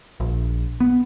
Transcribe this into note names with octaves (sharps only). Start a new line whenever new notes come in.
A#1
B3